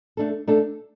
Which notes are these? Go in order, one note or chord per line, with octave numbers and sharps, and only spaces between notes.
A3 D4 A4
A3 D4 A4